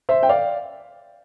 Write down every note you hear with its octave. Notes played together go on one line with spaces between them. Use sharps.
C5 E5
G5
D5 F5